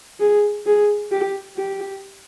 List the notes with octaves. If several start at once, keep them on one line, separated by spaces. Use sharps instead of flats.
G#4
G#4
G4
G4